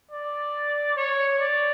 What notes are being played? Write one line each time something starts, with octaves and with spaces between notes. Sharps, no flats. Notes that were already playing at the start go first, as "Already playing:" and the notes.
D5
C#5
D5